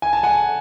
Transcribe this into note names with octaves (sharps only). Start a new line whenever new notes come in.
G#5
A5
F#5 G#5